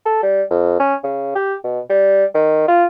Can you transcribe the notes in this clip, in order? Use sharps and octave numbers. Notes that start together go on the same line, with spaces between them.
A4
G3
F2
C#4
C#3
G4
B2
G3
D#3
F4